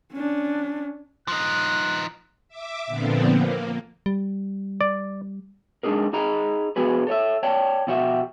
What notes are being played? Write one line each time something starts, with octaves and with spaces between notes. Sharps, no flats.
C#4 D4
F3 D#4 F#6
E5 D6
A#2 D3 F3 B3 C4
A#3
G3
D5
G#3 D4 D#4 G#4 A#4
D#4 G#4 D#5 A#5 B5
F3 B3 F#4 G#4 B4
A4 C#5 D#5 E5
C#5 D5 G5 A5
B2 F3 E4 F#4 G4 E5